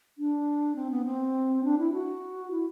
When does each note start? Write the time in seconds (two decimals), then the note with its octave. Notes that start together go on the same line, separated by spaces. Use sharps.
0.18 D4
0.76 C4
0.91 B3
1.05 C4
1.64 D4
1.79 E4
1.93 F#4
2.51 E4